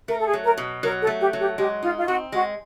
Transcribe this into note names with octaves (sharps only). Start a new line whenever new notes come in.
A3 A#4
A4
G#4
F#3
A#4
B2
F#3 A#4
A4
A3
G4
F#3
G4
G#3 G4
D#4 F4
F4
C4 F#4
G#3 F#4